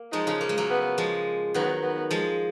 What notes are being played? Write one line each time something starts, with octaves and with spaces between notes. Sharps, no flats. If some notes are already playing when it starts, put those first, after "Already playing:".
Already playing: A#3
F3 G#3 D#4
C#3 F3
A#3
G#3
F#3 A#3
B3
F3 G#3
D#3 F#3 B3
B3
F3 G#3